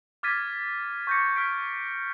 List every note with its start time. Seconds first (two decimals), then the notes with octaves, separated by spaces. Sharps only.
0.23 D6 F6 G#6 A6 B6 D#7
1.07 C#6 D6 G6 G#6 A#6 C#7
1.36 F6 G#6 B6 D7